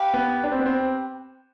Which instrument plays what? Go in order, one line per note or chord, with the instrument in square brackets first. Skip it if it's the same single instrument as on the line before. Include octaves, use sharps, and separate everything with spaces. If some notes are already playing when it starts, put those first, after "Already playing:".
Already playing: [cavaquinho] G4 B4 F5
[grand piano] B3
D4
C4
B3
C4